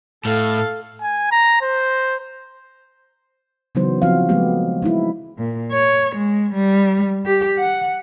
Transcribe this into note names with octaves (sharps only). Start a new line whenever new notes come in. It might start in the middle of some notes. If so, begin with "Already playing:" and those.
A2 A4 F5
G#5
A#5
C5
C#3 E3 F#3 B3 D#4 C5
F3 C4 F#4 F5
F3 F#3 G#3 A3 B3 G4
G#3 D#4 E4
A#2
C#5
G#3
G3
G4
F#5